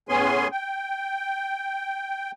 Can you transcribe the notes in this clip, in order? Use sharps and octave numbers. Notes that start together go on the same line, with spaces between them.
A2 B3 C#4 G#4 G#5 C6
G5